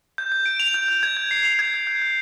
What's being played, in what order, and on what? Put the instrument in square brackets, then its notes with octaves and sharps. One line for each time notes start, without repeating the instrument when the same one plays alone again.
[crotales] G6
G6
D7
F7
G6
G6
G#6
G#6
C7
F7
G#6
G#6
G6
G6